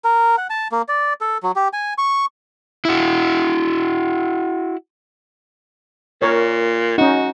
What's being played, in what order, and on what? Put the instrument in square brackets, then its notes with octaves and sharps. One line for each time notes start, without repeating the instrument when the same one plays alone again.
[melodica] A#4
F#5
A5
A#3
D5
A4
F#3
G4
G#5
C#6
[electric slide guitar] E4 F#4
[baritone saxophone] A#2 [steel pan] A#4 C#5
[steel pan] C#4 D#4 [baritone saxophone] F#4